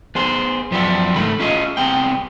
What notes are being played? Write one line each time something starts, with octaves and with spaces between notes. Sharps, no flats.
B3 G#4 C5
F#2 F3 G3 B3 E4
C#2 G#2 D#3 A3 B5
C#4 E4 F4 G#4 D5 D#5
C2 C3 B3 G#4 G5